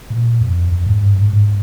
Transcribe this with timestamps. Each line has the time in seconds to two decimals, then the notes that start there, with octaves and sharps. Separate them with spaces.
0.10 A#2
0.41 F2
0.72 F2
0.87 G#2
1.02 G2
1.18 G#2
1.33 G#2